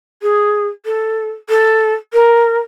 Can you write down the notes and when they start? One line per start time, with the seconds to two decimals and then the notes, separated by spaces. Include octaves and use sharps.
0.22 G#4
0.85 A4
1.49 A4
2.13 A#4